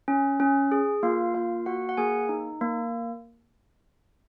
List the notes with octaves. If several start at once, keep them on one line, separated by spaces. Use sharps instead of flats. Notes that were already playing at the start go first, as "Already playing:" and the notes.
C#4
C#4
G#4
A#3 F4 F5
A#3 F4 F5
A#3 F#4 F#5
F#5
A#3 G#4 G#5
D#4
A#3